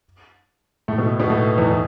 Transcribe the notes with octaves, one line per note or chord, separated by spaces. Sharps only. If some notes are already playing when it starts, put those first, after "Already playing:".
A2 A3
B2 B3
B2 B3
A2 A3
E2 E3
E3